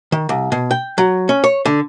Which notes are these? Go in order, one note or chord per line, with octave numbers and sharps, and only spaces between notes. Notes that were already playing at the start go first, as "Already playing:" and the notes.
D#3
C2
B2
G5
F#3
C#4
C#5
D3